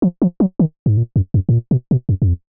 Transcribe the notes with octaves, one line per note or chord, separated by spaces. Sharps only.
F3
F3
F#3
D#3
G#2
A#2
F#2
F#2
G#2
A#2
B2
B2
F#2
F#2
F2